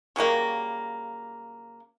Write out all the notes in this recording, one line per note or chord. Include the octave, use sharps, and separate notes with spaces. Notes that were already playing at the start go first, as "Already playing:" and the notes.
C#3 F#3 G3 A#3